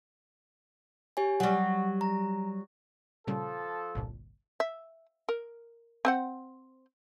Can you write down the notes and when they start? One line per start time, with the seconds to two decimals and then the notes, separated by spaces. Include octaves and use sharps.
1.17 G4 C#5 G#5
1.40 F#3 G3 F#5 C#6
2.01 A#5
3.27 A#2 C#3 F3 G3 A4
3.95 G1 C2 A#2
4.60 E5
5.29 A#4
6.05 C4 C5 F#5